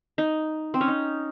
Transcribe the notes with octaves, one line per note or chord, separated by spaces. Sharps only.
D#4
C4
C#4
D#4